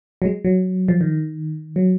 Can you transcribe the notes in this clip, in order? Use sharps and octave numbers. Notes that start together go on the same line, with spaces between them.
F#3
G#3
F#3
F3
D#3
F#3